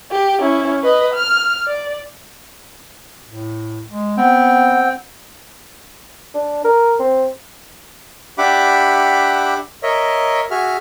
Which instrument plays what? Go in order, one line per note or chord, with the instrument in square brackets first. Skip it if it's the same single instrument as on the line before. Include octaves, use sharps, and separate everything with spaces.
[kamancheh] G4
C#4 E4
B4 D#5
F6
D5
[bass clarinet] A2
G#3
[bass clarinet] B3 [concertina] C4 G5 [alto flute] F#5
[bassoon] D4
A#4
C4
[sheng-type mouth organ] D4 G4 E5 F#5 B5 D6
A#4 C#5 D#5 E5
F#4 G#4 E5 F6